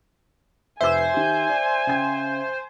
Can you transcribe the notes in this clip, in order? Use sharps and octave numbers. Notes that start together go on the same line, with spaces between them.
F1 B4 C5 E5 G#5 E6
D#3 G4
D5
C#3 G5 G#6